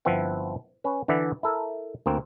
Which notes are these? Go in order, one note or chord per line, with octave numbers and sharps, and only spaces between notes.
G1 F3 C4 E4 B4 F#5
C#4 B4
D3 E3 B4 D5 E5 F#5
E4 A4 A#4
D2 A#3 C4